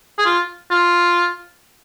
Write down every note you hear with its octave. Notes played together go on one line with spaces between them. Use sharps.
G#4
F4
F4